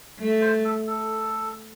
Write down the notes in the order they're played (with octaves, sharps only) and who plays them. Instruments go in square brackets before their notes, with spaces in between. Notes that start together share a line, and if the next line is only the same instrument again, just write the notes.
[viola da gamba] A3
[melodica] C5
A4
A4